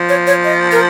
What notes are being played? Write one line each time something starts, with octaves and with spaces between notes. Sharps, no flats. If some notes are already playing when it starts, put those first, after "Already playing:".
Already playing: F3
C#5
C#5
D#5
A#4